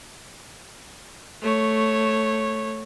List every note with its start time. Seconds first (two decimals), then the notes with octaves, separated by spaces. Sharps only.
1.42 A3 C#5